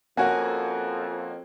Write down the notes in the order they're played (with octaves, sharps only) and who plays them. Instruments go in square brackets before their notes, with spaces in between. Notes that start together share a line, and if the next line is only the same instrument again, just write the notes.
[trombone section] F2 [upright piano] A#3 C#4 F#4 [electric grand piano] F#5 G#5